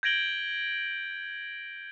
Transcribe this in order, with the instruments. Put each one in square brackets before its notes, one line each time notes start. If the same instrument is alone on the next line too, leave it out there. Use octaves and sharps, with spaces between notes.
[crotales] G6 G#6 A#6 D7 F#7 G7